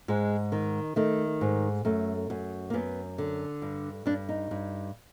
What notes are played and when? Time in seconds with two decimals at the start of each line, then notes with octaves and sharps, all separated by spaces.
0.08 G#2 G#3
0.52 D#3
0.96 D#3 A3
1.41 G#2
1.85 F#2 A3
2.30 F#2
2.70 A#3
2.74 F#2 B3
3.18 D3
3.62 G2
4.06 G2 D4
4.29 D#4
4.51 G2